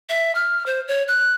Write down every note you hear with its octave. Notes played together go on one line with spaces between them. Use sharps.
E5
F6
C5
C#5
F#6